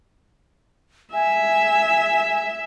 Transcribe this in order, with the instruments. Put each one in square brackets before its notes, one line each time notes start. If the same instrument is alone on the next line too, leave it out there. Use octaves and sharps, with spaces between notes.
[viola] E5 [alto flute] G#5